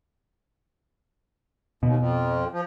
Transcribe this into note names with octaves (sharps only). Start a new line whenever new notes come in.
D#2 B2
F2
F3